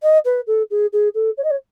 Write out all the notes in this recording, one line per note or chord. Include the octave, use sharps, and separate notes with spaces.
D#5
B4
A4
G#4
G#4
A4
C#5
D#5
C#5